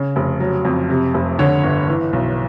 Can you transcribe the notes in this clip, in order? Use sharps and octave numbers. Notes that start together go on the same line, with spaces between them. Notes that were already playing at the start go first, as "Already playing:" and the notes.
Already playing: C#3
F1
F#3
F2
C3
F1
D3 C#5
G1
E3
B1